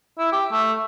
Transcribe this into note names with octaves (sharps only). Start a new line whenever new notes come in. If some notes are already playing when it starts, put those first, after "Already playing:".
E4
G4
A3